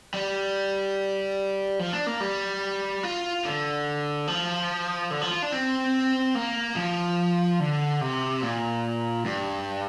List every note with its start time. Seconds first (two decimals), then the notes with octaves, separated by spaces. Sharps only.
0.14 G3
1.79 F3
1.93 D4
2.07 A#3
2.20 G3
3.03 F4
3.45 D3
4.27 F3
5.11 D3
5.21 F3
5.31 F4
5.42 D4
5.52 C4
6.35 A#3
6.76 F3
7.60 D3
8.01 C3
8.42 A#2
9.25 G2